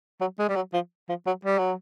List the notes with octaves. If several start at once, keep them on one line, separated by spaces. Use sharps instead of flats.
F#3
G#3
G3
F#3
F3
F3
F#3
G3
F#3